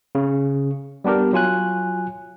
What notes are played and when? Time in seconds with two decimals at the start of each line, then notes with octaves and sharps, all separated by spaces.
0.15 C#3
1.04 G3 B3 D4 G4 A#4
1.33 F#3 F4 G#5 F#6